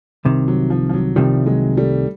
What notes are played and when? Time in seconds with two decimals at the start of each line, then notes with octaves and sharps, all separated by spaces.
0.25 C2 C3 D#3
0.48 F#3
0.70 F3
0.89 F3
0.93 F#3
1.16 C2 C3 D#3 F3 G3
1.46 F#3 G#3
1.77 G3 A3